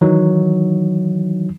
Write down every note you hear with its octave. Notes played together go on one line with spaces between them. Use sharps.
D#3 E3 F#3 D#4